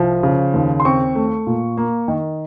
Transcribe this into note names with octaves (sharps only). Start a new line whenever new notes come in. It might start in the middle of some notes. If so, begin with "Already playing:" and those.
Already playing: C2 F3
C#3
D#2
C6
C4 C#6
A3
A#2
A#3
D#3